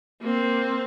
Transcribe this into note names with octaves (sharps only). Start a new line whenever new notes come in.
A#3 C4